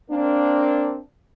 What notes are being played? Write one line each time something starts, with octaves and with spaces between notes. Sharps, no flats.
A#3 C4 D4